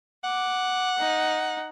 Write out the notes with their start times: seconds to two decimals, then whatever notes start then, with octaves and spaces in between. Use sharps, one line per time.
0.24 F#5 D6
0.98 D#4